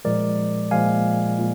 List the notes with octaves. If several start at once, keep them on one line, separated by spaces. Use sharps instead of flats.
A#2 F3 G#3 A#4 D5
A#2 F3 G#3 F5 G#5
A#2